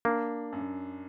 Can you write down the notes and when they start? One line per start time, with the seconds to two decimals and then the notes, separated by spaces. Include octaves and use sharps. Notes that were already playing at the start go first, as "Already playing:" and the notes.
0.05 A#3 D4
0.53 F#2